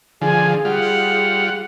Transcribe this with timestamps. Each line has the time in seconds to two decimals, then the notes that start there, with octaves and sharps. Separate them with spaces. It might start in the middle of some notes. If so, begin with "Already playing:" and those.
0.22 D3 F3 G#4 G#5
0.65 G3 F4 F#5